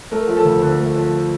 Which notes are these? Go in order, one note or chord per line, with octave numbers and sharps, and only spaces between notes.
A3 A#4
F3
A4
D2
D3
A3
F3